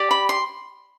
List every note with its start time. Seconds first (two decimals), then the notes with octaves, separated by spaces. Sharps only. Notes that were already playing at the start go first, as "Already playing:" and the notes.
Already playing: G4 D5
0.11 B5
0.29 C6